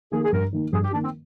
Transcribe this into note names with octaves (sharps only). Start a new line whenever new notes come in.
D#3 A#3 G#4
G#4
G2 A#4
D#3 A#3
G2 G#4
G4
D#3 A#3 D4
C4